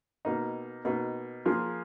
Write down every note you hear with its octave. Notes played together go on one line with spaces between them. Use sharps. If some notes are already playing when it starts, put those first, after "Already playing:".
B2 A#3 D#4
B2 A#3 D#4
F3 A#3 F4 G#4